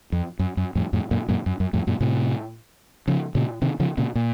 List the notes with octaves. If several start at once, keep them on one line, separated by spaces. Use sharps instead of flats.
F2
F#2
F#2
F2 A2
F2 A2
F#2 A#2
F#2 A#2
F#2
F#2
F2 A2
F#2 A#2
A2 C3
C#3 F3
A#2 C#3
C3 D#3
C#3 F3
A#2 C#3
A#2